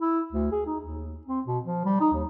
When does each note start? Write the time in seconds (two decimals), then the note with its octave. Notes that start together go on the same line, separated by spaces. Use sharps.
0.01 E4
0.33 D2
0.52 G#4
0.66 D#4
0.80 D#2
1.27 C4
1.47 B2
1.65 F3
1.85 G3
2.01 D#4
2.13 D#2